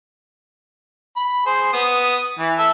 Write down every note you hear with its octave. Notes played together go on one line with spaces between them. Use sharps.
B5
G#4 C5
B3 D#6
E3
A4 E5